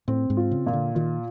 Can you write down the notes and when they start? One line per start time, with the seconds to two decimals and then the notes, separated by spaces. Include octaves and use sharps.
0.08 A2 C4
0.30 G#2
0.37 F4
0.51 C#3
0.66 A#2
0.73 D3
0.95 D#3 F4